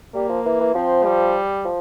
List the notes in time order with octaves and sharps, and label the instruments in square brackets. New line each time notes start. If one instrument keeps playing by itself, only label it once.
[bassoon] G3 [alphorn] A#3
[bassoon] F3
E3
E3
[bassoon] F3 [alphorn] C4
[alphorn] G3
[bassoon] F3